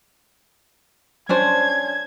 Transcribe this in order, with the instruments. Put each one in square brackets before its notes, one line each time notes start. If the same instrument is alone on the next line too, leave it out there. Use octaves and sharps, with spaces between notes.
[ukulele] C#4 D4 C5 [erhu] G#6